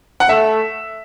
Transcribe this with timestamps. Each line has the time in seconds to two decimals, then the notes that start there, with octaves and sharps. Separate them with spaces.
0.20 F#5
0.29 A3 E5